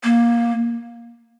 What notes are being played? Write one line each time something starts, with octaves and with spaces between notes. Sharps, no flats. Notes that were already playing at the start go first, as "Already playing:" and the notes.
A#3